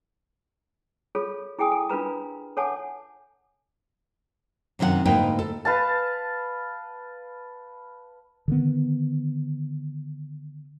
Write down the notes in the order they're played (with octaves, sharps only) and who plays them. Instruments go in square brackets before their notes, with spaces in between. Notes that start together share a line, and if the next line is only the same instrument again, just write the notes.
[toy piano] F4 G#4 A4 C#5
E4 G#4 G5 G#5 D#6
A4 G#5
D4 F4 A#4 B4 A#5
A4 C#5 F#5 G#5 A5 D6
[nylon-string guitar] F#2 C3 D#3 C5 F#5
D2 G#2 A#3 D#4 B4 G5
A4
[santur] B4 F5 A5
[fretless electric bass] D3 D#3 B3